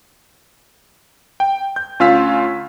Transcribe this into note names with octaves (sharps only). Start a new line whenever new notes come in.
G5
G6
D2 C#4 F4 F5 E6 B6